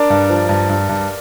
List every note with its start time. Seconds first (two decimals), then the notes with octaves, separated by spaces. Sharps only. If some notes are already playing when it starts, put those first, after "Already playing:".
Already playing: D4 A#4 D5
0.10 G2
0.30 F3
0.49 G2
0.69 G2
0.89 G2